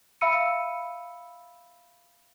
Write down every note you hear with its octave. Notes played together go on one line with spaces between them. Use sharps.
E5 F5 B5 E6 C#7 D#7